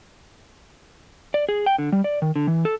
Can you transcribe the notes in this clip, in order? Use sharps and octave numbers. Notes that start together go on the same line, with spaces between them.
D5
G#4
G5
D3
G3
D5
D#3
D3
E3
A4